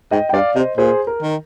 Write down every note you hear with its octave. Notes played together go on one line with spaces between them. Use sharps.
G#2 D#5 G5
G5
G2 D5 F5
C3 C5 D#5
A#2 G#4 C5
A#4
D#3